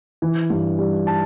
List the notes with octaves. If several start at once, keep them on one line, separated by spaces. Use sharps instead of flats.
E3
G2
G3
A5